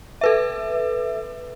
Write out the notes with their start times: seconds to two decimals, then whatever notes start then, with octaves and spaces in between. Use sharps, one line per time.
0.21 A4 B4 E5